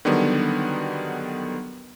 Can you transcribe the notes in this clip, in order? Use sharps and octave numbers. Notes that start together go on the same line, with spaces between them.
D3 D#3 F#3 G3 B3